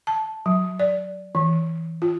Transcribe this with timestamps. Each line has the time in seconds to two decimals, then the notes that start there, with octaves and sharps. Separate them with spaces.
0.07 A5
0.46 F#3
0.79 D5
1.35 E3
2.02 F4